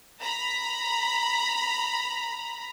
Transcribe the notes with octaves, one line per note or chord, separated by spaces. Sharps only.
A#5 B5